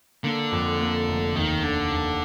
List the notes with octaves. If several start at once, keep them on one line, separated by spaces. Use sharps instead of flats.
D3 A#3
F2
A#3
F1
D#2 D#3
D3 D4
D#2